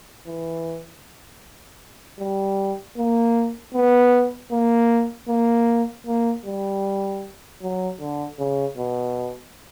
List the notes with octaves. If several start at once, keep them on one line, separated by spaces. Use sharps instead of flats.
E3
G3
A#3
B3
A#3
A#3
A#3
G3
F#3
D3
C#3
B2